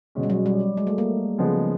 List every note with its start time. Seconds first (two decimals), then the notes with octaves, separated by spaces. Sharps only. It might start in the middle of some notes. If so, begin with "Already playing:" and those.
0.15 B2 G#3 C#4
0.23 G3
0.30 F#3
0.46 G3
0.77 G#3
0.87 A3
0.98 A#3
1.38 C#3 F3 G#3 B3